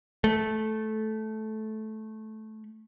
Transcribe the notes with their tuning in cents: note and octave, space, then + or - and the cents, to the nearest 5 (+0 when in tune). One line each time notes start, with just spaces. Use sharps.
A3 -15